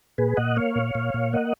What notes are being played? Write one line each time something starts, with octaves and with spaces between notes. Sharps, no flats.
A#2 G#4 B4
A#2 D#5 F#5
A#3 C#5 F5
A#2
A#2
A#2
A#3 D#5 F#5